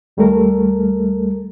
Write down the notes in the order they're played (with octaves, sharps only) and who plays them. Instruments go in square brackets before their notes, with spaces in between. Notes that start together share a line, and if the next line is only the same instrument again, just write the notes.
[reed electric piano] D#2 G3 A3 A4 A#4